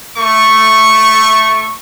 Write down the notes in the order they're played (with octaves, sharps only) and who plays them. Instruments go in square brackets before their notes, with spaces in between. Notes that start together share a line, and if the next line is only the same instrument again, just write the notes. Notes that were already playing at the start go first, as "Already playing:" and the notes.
[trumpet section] A3 C#6